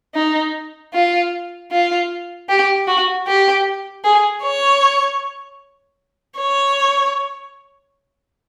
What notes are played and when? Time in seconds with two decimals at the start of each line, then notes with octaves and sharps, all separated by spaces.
0.15 D#4
0.94 F4
1.72 F4
2.50 G4
2.88 F#4
3.27 G4
4.04 G#4
4.43 C#5
6.39 C#5